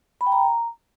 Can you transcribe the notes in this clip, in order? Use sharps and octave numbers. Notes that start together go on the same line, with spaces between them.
B5
G5
A#5